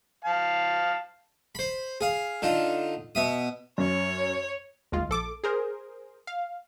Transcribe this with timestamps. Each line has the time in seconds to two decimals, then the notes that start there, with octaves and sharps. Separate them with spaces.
0.25 F5 A5
1.55 C5 B5
2.01 G#4 F5
2.42 D3 D#4 F4
3.15 B2 E5 D#6
3.78 F#2 C#5
4.92 G1 D#2 G#3 F4
5.09 A#1 A4 D6
5.44 G#4 A#4 C5
6.27 F5